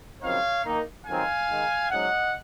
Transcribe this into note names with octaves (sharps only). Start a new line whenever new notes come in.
F#2 C#3 F3 C4 D#4 C#5 F5
D#3 A#3 D#4
F2 D#3 F#3 C4 D#4 F5 G#5
D#3 G#3 D#4
G#2 F#3 C#4 D#5 F#5